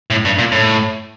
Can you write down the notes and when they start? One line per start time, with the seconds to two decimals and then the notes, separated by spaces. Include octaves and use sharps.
0.10 A2
0.25 G2
0.39 A#2
0.52 A2